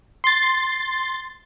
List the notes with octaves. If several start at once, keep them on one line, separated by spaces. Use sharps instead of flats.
C6 A6